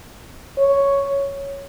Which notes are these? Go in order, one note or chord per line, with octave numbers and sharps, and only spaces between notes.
C#5